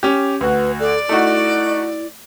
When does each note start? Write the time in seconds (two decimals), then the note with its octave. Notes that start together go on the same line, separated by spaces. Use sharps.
0.03 C#4 G4
0.41 D2 F#4 B4
0.80 A4 D5
1.09 A3 D#4 E4 F#4